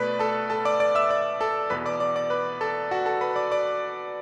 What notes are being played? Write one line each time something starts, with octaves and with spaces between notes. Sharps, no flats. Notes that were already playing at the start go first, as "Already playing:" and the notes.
Already playing: B2 A3 B4 D5 B5
A4 A5
A4 A5
D5 D6
D5 D6
E5 E6
D5 D6
A4 A5
E2 B2 B3 B4 B5
D5 D6
D5 D6
D5 D6
B4 B5
A4 A5
F#4 F#5
A4 A5
B4 B5
D5 D6
D5 D6